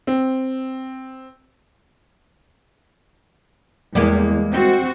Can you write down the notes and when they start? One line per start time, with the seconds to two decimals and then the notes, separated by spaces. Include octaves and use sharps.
0.07 C4
3.95 E2 G3 G#3 A#3
4.51 C4 F#4